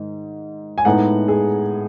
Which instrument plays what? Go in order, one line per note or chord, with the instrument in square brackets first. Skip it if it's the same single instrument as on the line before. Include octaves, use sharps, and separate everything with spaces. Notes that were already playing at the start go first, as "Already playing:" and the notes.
Already playing: [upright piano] G#2 D#3 G#3
G#5
A2 G#3 B3 D#4 F#5
G#4